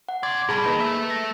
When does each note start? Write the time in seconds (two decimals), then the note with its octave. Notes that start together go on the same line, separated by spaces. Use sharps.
0.09 F#5
0.23 C#3 D5 C6 G#6
0.49 B2 G3 G#4 A5 B5
0.66 A#3 D#4 A#4 B4
0.80 A4 E5
1.07 A#6 C#7